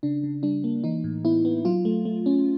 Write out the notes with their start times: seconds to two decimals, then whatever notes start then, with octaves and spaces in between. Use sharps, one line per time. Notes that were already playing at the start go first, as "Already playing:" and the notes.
0.03 C#3 D4
0.24 C#3
0.43 G3 D4
0.64 A#3
0.84 E3 D#4
1.04 A2
1.25 B3 E4
1.45 B3
1.65 F#3 F4
1.85 A3
2.05 A3
2.26 C#4